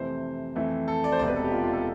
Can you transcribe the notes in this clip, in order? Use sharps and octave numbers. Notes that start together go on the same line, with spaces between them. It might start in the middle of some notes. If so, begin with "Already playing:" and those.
Already playing: F2 C3 E3 A3 C5
F2 E3 A3
A4
D5
C5
E1 E2 C3 D5
B4
A4
G4
F4
F4
A4